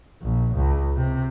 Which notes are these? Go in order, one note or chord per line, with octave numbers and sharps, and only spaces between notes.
A#1
C#2
C3